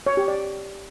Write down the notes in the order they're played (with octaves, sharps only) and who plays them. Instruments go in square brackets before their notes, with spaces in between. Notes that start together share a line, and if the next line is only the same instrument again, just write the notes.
[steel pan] C#5
G4
D5